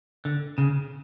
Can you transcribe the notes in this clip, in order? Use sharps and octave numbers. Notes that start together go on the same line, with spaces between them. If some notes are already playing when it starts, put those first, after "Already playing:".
D3
C#3